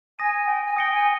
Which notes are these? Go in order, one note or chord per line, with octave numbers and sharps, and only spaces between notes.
G#5 D#6 A#6 D#7
G5
G#5
G5 D#6 A#6 C#7 G7
G#5